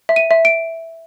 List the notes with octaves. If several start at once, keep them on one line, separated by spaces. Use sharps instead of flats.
E5
D#7
E5
D7